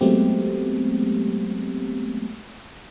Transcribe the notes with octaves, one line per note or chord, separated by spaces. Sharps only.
F#3 G#3 A3 B3 C4 G4